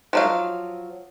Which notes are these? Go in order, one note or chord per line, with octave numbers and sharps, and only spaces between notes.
F3 F#3 F5